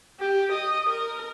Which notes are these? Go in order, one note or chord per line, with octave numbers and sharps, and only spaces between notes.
G4
D#5
A#4